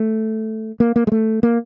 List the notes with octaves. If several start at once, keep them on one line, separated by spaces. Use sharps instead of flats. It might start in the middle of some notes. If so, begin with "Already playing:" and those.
Already playing: A3
A#3
A#3
G#3
A3
A#3